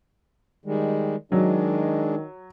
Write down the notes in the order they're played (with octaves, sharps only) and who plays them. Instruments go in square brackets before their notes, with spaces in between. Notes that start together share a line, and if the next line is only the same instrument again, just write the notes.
[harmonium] D#3 G3 G#3
[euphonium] D#3 [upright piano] F#3 [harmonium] G#3 D4